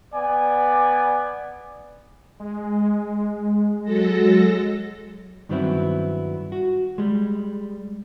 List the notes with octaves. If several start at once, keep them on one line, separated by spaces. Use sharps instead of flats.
B3 D5 G#5
G#3
F#3 A4 A#6
G2 D#3 F#3 B3 C4 E4
F#4
G3 G#3